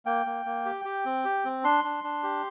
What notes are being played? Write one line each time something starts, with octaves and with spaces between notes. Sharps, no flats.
A#3 G5
A#3
A#3
G4
G4
C4
G4
C4
D4 C6
D4
D4
G4